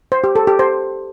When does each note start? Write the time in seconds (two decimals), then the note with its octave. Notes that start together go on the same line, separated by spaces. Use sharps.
0.12 C5
0.24 G4
0.36 A4
0.47 G4
0.59 C5